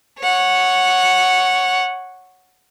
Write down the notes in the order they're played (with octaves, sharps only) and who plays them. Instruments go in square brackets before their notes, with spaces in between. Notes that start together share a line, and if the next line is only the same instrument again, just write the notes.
[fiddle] C#5 F#5